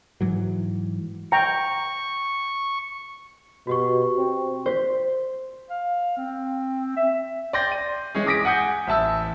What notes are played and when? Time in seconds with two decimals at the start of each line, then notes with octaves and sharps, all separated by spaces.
0.21 G#2 E3 F#3
1.32 G5 A#5 C#6
3.67 B2 F#4 G4 C#6
4.17 C4
4.66 C5 B6
5.70 F5
6.17 C4
6.97 E5
7.53 D5 G5 C6 G6 A#6
7.72 D#7
8.15 E3 G#3 C#4 G#4
8.26 D6 D#6 A#6 B6 D7
8.45 F#5 G#5 D#6 G6
8.87 A1 E5 A5 E6